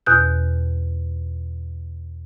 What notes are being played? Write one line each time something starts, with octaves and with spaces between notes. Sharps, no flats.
E2 B2 F#6 G6